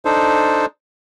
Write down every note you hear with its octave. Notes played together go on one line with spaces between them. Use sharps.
D4 D#4 A4 C5